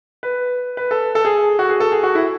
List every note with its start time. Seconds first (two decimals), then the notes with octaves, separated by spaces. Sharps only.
0.23 B4
0.77 B4
0.91 A4
1.15 A4
1.25 G#4
1.59 F#4
1.69 G#4
1.80 A4
1.92 G#4
2.03 F#4
2.15 E4